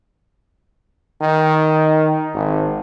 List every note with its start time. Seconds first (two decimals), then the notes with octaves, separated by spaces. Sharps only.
1.21 D#3
2.34 G#1